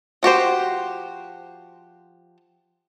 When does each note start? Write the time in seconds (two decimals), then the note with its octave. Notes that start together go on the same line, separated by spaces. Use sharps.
0.23 F3 F#4 G4 C5